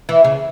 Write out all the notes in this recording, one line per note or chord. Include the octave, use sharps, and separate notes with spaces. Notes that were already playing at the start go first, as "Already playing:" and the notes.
E3
C#3